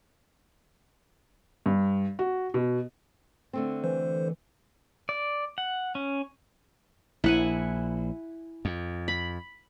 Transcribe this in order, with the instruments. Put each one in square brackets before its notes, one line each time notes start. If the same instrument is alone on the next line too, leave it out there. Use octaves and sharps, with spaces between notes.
[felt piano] G2
F#4
B2
[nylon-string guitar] D3 A3 C4
[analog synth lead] E3 [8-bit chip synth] C5
[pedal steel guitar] D5
F#5
C#4
[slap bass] A#1 [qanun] E4 F#5 G#5
[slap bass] F2
[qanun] B5